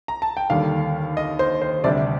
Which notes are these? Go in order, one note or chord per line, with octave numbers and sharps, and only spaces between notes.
A#5
A5
G5
D#2 D3 G3 F5
D#5
C5
C5
D2 C3 G3 D4 D5